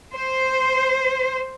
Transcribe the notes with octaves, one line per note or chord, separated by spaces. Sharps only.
C5